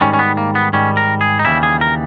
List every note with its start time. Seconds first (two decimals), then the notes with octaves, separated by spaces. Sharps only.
0.01 G#2 D#3 G3 C#4
0.13 C#4
0.19 B3
0.37 A#3
0.55 B3
0.73 G#2 D#3 G3 C#4
0.97 A#4
1.21 G#4
1.39 D#4
1.45 D#2 C#3 E3 G3 E4
1.63 G#4
1.81 A#4